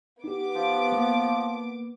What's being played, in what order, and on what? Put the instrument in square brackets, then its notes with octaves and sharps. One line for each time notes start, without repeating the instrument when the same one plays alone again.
[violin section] B3 D6 [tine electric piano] D#4 G4
[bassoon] F3
[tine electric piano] A#3